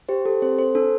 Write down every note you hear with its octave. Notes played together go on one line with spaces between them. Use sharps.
G4 C5
G4 A4
C4 C5
A4 C5
D4 A4